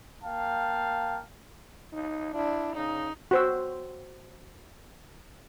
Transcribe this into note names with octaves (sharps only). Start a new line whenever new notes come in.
A#3 F5 G5 A5
D#4
D4 E4
C#3 D#4
F#4 C5 E6